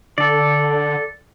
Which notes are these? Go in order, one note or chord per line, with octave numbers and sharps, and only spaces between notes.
D3 A4 D5